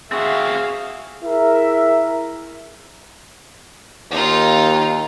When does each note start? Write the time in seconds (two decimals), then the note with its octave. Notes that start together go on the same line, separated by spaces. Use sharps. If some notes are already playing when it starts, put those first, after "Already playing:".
0.12 C4 F#4 G#4 E5 F5
1.23 E4 G#4 A#4 E5
4.11 D#2 D#4 F4